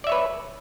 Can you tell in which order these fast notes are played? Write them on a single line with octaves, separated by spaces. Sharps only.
D5 E5 C#5 B4